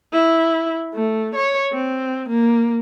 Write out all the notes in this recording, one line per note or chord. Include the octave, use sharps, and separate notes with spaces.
E4
A3
C#5
C4
A#3